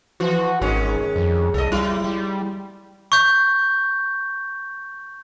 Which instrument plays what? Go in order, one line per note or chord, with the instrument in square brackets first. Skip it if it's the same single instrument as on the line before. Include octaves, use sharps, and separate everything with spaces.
[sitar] E3 F3 [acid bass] F#4
[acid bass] G#1 [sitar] D#3 G#3 C#4
[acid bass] F2
[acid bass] C2 [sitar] A4 D#5
[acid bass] G3 [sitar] E4
[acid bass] G3
[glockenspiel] C#6 G6